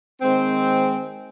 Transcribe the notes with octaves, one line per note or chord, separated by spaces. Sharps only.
D#3 G#3 C4